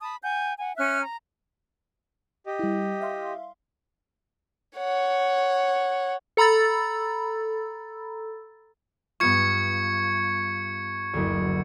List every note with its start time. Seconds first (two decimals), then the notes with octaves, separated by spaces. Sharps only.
0.01 A5 B5 D#6
0.23 F#5 G#5 G6
0.59 F#5 G#5
0.77 C#4 E5 F6 F#6
1.02 A#5
2.46 G4 D#5
2.59 G3 E4
3.01 E5 F5 C6
4.78 C#5 F#5
6.37 A4 A#5 B5 E6 A6
9.20 G2 B3 F4 C#6 G#6 C#7
11.14 F#1 D2